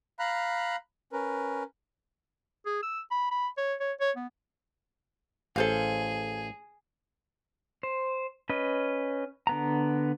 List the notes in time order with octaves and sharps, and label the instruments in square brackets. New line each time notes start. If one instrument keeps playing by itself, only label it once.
[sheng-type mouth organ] F5 A#5 B5 F#6
C#4 A#4 B4
[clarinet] G#4
E6
B5
B5
C#5
C#5
C#5
B3
[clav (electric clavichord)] A1 [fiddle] G#4 [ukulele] A4 C5 F5
[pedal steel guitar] C5
C#4 B4 D#5
D3 B3 A#5